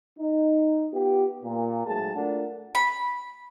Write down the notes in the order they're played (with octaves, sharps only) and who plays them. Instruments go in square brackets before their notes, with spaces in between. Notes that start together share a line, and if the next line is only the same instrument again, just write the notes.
[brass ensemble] D#4
B3 F4 G4
A#2
G#2 F#3 A3 G#4 A5
A3 D4 F4 A#4 F#5
[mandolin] B5